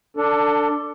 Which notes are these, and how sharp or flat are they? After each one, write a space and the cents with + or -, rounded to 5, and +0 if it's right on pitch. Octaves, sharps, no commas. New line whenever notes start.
D4 +0 A4 +25